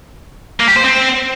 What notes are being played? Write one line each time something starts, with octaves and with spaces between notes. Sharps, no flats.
A#3
G4
C5
C4